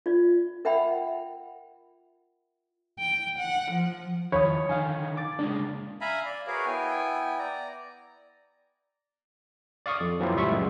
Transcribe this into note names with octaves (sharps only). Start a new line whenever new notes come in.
F4 D5
A#4 E5 F#5 G5 B5
G5
F#5
F3
D#3 F3 C#5 B5 D#6
D3 D#3 D#4 F5 G#5
D6 A6
C#3 G#3 A#3 D4
E5 F5 G#5 A#5 B5
D5
F#4 G#4 A#4 B4 C#5 F5
B3 E4 G5 G#5
D5 A#5
D5 F5 C#6 D#6
F2
E3 F#3 A#3 C4 E4 F4
C#2 A2 G3 F4 E5 C#6
F#2 A#2 F#3 G#3 B3